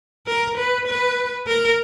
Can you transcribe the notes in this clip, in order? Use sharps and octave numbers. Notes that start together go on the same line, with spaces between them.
A#4
B4
B4
A#4